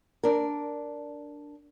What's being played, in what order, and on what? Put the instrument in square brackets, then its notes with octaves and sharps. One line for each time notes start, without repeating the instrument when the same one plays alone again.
[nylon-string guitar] D4 A#4